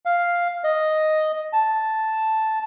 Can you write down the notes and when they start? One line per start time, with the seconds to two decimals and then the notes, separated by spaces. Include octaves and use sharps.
0.05 F5
0.64 D#5
1.53 A5